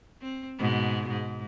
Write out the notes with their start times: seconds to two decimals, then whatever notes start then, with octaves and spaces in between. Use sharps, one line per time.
0.21 C4
0.58 G#2 B2
1.10 G#2